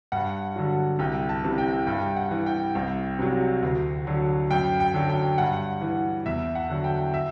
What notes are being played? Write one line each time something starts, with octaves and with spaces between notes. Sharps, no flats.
G2 F#5
D3 F#3
C2 G5
A5
C3 E3
G5
G2 G5
F#5
E3
G5
C2
C3 F#3
D2
D3 F#3
F#2 G5
G5
D3 F#3
G5
G2 F#5
E3
E2 E5
F#5
D3 F#3
G5
E5